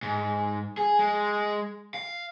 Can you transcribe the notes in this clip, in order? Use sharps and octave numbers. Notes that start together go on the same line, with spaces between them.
G#2
G#4
G#3
F5